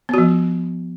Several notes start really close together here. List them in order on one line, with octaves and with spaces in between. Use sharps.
B3 F#4 F3